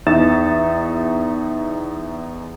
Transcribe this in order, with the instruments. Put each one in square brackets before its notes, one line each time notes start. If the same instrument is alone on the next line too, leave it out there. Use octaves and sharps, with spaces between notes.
[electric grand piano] E2 D#4 E5 A6 E7